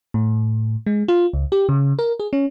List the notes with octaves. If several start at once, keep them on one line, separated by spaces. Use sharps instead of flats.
A2
G#3
F4
C#2
G4
C#3
A#4
G#4
C#4